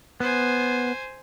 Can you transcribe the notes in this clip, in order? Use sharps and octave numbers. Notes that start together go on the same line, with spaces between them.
B3 C5 G#5